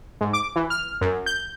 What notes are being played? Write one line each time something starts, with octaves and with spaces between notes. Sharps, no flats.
G#2
D6
E3
F6
F#2
G6